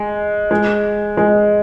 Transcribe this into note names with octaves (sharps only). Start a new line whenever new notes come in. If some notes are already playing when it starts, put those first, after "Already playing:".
Already playing: G#3
G#3
G#3